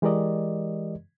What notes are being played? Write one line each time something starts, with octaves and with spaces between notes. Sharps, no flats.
E3 G#3 G4 A#4 D5 D#5